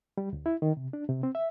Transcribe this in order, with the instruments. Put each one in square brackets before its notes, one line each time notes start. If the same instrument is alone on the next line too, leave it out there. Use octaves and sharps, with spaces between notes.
[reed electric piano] G3
D2
E4
D#3
C3
D4
C3
C4
E5